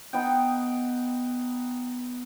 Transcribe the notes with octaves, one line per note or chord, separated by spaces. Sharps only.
B3 D#4 G5